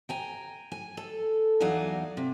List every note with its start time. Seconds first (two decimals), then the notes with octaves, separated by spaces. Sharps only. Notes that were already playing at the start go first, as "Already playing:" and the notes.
0.09 G5 G#5 A#5
0.72 G#5
0.97 A4
1.60 E2 F#3 D#4 D5 F5 G#5
2.17 C3